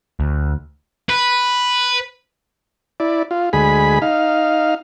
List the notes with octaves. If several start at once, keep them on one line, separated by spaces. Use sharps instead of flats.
D2
B4
E4 D5
F4
D2 G#3 G#4 B5
D#4 F5